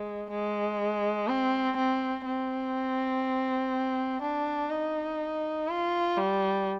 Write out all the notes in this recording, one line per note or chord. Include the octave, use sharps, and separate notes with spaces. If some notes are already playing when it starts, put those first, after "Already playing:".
Already playing: G#3
G#3
C4
C4
C4
D4
D#4
F4
G3